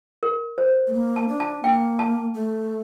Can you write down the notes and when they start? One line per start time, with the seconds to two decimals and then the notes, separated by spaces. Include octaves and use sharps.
0.23 A#4
0.58 C5
0.87 A3
0.93 A#3
1.16 A5
1.28 D4
1.40 A5
1.63 A#3 G5
1.99 A5
2.34 A3